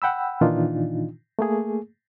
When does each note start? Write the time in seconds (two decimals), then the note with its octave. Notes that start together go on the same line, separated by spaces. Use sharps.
0.02 F#5 G5 B5 E6
0.41 A#2 D#3 E3 D4 D#4 F4
1.39 A3 A#3 G#4